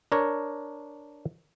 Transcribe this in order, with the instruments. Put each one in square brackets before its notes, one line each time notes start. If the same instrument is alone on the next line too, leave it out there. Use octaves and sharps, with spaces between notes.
[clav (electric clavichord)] D4 A#4 C#5